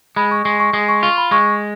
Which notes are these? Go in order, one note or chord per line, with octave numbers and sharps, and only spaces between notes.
G#3 B5
C#6
G#3 C#6
C#6
G#3 D#6
C#6
F4 C#6
B5
G#3 C#6